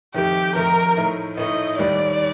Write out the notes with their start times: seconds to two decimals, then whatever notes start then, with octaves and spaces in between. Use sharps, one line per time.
0.15 F2 D#3 A3 D#4 G4
0.55 F2 D#3 A3 D#4 A#4
0.97 A2 A3 D#4
1.37 A2 A3 D#4 D#5
1.79 D#2 D#3 G3 D5